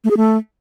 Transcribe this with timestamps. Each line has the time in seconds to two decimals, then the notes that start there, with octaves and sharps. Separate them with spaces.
0.04 A3
0.10 G#4
0.17 A3